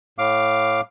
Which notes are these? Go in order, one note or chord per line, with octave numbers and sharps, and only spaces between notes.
A2 F5 D6